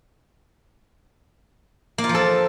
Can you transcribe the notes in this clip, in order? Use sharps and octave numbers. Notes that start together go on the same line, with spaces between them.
A#3
F4
F3
A4